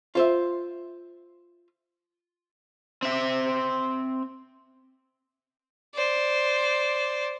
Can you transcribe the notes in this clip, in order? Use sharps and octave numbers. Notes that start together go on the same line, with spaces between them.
F4 C5 E5
C4 E5
C5 D5